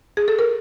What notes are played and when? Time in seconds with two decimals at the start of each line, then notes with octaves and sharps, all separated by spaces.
0.17 G#4
0.28 A4
0.39 A#4